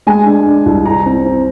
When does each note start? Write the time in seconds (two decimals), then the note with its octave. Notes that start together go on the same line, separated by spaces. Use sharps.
0.07 G#3 G#5
0.26 D4
0.46 D4
0.66 C2
0.86 C2 A#5
1.06 C4
1.26 C4